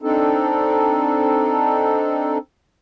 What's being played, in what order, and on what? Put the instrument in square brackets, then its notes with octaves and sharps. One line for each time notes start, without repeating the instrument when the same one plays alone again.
[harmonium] C4 D4 D#4 A4